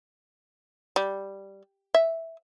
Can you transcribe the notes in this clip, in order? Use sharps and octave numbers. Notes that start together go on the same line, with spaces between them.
G3
E5